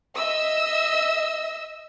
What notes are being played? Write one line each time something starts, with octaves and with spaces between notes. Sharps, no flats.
D#5 E5 E6